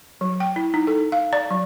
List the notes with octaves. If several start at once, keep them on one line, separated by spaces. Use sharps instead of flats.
F#3
G5
E4
D#4
A4
F5
D5
F#3